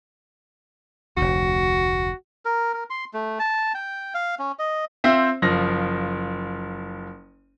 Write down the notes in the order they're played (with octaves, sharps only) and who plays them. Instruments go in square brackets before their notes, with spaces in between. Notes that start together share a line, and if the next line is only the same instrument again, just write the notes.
[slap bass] F1 D2 [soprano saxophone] F#4
[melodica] A#4
A#4
C6
A3
A5
G5
F5
C#4
D#5
[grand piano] C4 F4 C5 E5
F#1 F3 A#6